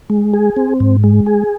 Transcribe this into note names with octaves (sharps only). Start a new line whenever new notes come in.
G#3
G#4
C4
G#2
G#3
G#4